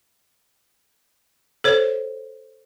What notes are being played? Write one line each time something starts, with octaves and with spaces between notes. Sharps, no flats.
A4 C5 C#5